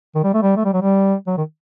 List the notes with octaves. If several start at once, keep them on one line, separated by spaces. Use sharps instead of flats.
D#3
G3
A3
G3
A3
G3
F#3
G3
F#3
D#3